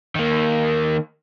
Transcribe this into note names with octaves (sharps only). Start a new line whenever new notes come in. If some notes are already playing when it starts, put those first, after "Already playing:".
D#3 A#3